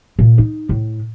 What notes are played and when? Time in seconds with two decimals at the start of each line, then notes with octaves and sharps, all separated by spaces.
0.19 A#2
0.38 D#4
0.69 A2